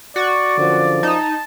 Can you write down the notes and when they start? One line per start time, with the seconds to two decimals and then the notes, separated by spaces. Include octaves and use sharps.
0.16 F#4 D5 C#6
0.57 F#2 D3 F3
1.03 D#4 A5